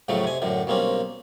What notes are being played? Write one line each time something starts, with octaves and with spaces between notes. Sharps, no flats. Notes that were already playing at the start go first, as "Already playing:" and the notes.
F2 A2 C#3 F#3 A3
C3 G#5
F#2 A2 D3
B1 G3 A#3 C4 C#4